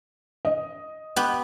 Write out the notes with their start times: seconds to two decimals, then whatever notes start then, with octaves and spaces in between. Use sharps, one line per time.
0.45 D#5
1.16 B3 G4